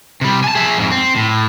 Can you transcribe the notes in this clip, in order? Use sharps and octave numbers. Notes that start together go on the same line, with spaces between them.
C3 G3
G#5 A5
G#4 E5
F2 G#2
C4
A2